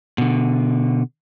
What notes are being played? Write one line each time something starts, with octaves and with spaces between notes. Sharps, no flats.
B2 D3